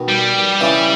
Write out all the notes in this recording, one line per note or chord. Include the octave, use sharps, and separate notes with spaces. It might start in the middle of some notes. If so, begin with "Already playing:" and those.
Already playing: B2 D#3
G3
C#3 E3